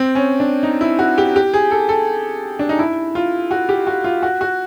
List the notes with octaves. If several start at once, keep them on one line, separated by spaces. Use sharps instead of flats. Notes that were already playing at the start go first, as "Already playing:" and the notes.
Already playing: C4
C#4
D4
D#4
E4
F#4
G4
G4
G#4
A4
A4
D4
D#4
E4
F4
F#4
G4
F#4
F4
F#4
F#4